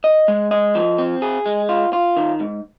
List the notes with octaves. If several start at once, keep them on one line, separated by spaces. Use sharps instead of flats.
D#5
G#3
D#5
F3
C4
G#4
G#3
F4
F4
D#3
G#2